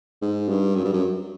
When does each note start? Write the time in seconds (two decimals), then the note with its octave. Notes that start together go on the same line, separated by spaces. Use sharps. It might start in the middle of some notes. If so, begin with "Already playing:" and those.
0.22 G#2
0.49 G2
0.75 F#2
0.85 G2
0.93 F#2